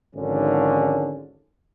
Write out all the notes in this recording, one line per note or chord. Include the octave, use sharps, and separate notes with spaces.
G#1 G#2 D3 F3 C#4